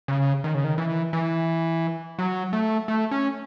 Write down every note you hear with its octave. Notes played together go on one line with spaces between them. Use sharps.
C#3
D#3
C#3
D#3
E3
E3
F#3
A3
A3
C#4